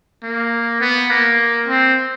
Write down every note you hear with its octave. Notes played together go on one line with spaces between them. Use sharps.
A#3
B3
A#3
C4